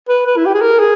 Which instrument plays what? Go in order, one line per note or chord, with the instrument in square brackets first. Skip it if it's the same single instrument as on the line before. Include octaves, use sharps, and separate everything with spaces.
[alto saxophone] B4
B4
E4
G4
G#4
A#4
G#4